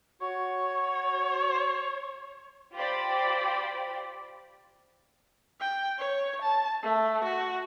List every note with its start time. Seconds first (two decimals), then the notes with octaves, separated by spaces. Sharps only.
0.21 F#4 C#5 C#6
2.75 F4 G4 C5 D5 G5 B5
5.60 G5
5.99 C#5
6.42 A5
6.83 A3
7.24 F#4